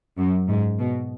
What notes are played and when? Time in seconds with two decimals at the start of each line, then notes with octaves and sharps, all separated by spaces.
0.18 F#2
0.48 G#2
0.79 B2